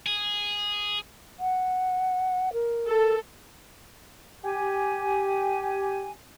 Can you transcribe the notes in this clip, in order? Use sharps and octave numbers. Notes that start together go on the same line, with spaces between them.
G#4
F#5
A#4
A4
G4 G#5